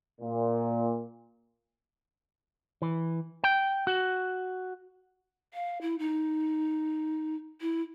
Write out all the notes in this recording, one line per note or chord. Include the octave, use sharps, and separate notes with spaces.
A#2
E3
G5
F#4
F5
E4
D#4
E4